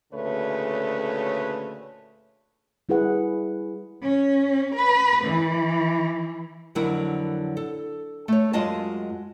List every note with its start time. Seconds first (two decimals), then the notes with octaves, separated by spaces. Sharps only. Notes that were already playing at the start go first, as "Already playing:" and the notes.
0.13 D2 A#2 C#3 A3 B4 C#5
2.89 G3 E4 G#4 B4 F#5
4.02 C#4
4.75 B4
5.25 E3
6.75 F2 D3 F#3 E4 A#4
7.57 A4
8.28 A3 C#5
8.53 F#2 F#3 G#3 F4 D#5 A5